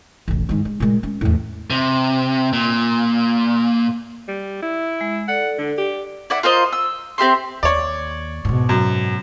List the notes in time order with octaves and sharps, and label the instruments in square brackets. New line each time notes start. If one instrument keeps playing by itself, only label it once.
[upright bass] E1 A1
G#2 D#3
G#3
A#2 G#3
C#4
E2 A2
[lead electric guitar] C3
A#2
[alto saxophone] G3
E4
[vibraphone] G#3
[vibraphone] A4 D5 [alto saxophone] F#5
[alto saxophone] D3
[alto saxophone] G4 [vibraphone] D5
[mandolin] E4 D5 F#5
F4 A#4 C5 D#5
E6
C4 G4 E5 C6
[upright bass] D#2 [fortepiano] C#5 D5
[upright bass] G#2 B2
[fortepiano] F#2